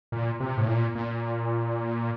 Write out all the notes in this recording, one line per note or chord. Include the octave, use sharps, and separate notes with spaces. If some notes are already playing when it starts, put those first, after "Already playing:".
A#2
C3
A2
A#2
A#2